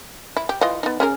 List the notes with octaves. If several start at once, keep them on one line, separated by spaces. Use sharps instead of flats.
E4
G4
E3 F4 D#5
B3 D#4
C#4 G#4 A#4